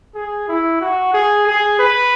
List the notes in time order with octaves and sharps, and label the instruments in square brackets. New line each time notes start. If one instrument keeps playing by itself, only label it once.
[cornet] G#4
E4
F#4
G#4
G#4
B4